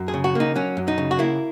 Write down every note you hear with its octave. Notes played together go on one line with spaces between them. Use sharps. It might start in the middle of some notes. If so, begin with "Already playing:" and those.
Already playing: F#2
G#4
C#3
F#4
A#3 D#4
F#3 C#4
F#2
D#4
C#3
F#4
A#3 E4